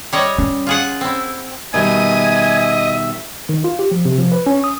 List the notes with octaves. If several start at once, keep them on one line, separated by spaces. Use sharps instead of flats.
G3 C#5 D#5
C#4
F4 G#4 F#5
C4 E4
B2 D#3 G3 D#5 E5 G#5
D#3
F4
G4
F3
C3
F3
B4
C#4
D#6